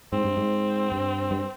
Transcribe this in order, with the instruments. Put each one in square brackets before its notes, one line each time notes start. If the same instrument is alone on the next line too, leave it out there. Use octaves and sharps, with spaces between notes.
[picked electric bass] G#2 [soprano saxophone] C4
[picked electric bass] G2
G#2
G2
G2